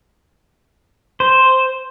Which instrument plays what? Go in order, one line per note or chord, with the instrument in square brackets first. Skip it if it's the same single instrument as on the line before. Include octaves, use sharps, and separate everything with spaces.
[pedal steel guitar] C5